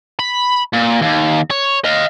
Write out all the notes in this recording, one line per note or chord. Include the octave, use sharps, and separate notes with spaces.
B5
A#2
D#2
C#5
D#5 F5